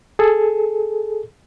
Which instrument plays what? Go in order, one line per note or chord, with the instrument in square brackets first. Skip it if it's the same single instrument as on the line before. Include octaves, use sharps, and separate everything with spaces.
[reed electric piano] G#4 A4